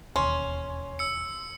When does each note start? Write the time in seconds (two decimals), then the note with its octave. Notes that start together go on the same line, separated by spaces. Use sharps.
0.16 E1 D#2 C#4 C6
0.99 E6 C#7